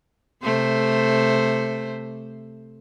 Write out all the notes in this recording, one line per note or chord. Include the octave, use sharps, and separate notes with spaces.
C3 A3 C5